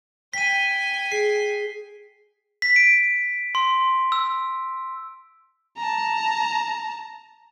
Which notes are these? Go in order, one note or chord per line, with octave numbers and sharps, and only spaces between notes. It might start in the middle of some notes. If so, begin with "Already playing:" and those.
G5 G#5 B6 D#7
G#4 C7
B6
D7
C6
E6
A5 A#5